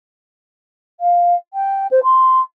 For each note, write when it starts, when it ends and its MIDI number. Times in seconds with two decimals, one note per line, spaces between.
1.00 1.34 77
1.53 1.87 79
1.91 1.99 72
2.03 2.40 84